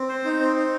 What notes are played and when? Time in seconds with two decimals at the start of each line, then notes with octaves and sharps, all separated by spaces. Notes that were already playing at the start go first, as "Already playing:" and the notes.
Already playing: C4
0.09 C5
0.25 D#4
0.40 C4
0.56 D#4